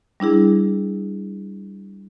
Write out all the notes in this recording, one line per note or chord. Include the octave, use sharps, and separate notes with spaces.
G3 D4 E4 G#4